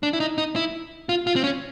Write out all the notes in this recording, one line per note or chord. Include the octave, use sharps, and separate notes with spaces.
D4
E4
D#4
D#4
E4
F4
F4
C4
C#4